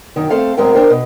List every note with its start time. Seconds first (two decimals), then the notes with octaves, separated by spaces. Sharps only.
0.16 F#2 D#3
0.30 A3 C4 A4 F5
0.57 A2 F#3 G#3 C4 A#4 G5
0.73 D4 A#4 C5 G5
0.90 B2